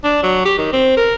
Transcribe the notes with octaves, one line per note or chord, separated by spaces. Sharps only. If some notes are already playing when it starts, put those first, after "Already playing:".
D4
F#3
G4
D#3
C4
A#4